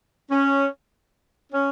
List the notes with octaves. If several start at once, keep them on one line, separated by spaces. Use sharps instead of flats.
C#4
C#4